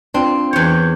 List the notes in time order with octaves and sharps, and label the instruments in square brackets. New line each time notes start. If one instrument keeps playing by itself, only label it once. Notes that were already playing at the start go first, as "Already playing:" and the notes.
[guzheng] C4 [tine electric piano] D4 F4
[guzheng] E2 C#5 [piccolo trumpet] G6